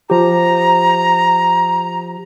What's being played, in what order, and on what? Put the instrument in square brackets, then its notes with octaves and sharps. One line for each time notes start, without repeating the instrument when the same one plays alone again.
[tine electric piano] F3 G4 [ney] A#5